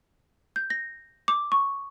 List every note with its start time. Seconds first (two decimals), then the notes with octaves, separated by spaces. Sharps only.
0.56 G6
0.70 A#6
1.28 D6
1.52 C#6